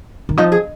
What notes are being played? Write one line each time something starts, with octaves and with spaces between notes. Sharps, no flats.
D#3
F3 D#4
G#4